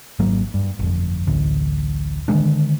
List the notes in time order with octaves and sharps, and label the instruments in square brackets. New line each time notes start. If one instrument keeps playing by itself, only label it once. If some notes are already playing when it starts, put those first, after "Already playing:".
[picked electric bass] G#1 G#2 F#3 A#3
G2
G1 F2
A1 D2
D3 D#3 G#3 D4